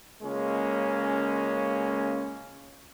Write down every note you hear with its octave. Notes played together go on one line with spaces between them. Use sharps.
C#2 G#3 A#3 C#4